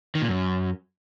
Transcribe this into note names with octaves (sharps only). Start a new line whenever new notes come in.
D#3
A#2
F#2